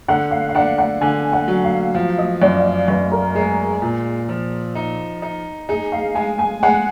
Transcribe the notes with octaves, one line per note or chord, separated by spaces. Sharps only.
D3 F#5
F5
F5
D4 F#5
F#5
D3 G#5
F#5
F#3
F5
F3 F5
D#5
F#2 D5
F5
D#5
F#2 B4
A#4
G#3 G#4
A#2
F3
D#4
D#4
D#4 G#4
F5
G#3 G#5
G#5
G#3 F#5